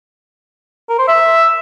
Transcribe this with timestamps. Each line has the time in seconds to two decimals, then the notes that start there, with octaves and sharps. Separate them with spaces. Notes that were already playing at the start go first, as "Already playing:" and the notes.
0.89 A#4
0.98 C5
1.08 E5